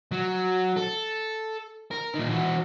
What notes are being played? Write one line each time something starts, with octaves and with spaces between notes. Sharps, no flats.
F#3
A4
A#4
A#2 D#3
E3 F#4